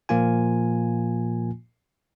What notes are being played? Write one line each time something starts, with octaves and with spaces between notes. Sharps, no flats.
A#2 F3 A#3 F4 G#5